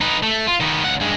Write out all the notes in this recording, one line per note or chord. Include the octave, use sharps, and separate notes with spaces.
D#4 B4
A3
F4
D#3 B3
C#2 F#5
G2 G#3